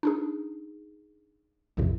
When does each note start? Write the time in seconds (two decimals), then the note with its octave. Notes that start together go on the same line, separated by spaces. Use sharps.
0.03 D4 D#4 G#4
1.77 A#1 F2 A2 C3